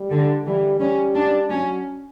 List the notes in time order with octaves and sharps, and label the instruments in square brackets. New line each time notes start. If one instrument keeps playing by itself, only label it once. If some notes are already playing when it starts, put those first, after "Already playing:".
Already playing: [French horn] G3
[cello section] D3
[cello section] E3 [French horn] G3
[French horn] G3 [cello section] C#4
[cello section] D4
[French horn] F#3 [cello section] C#4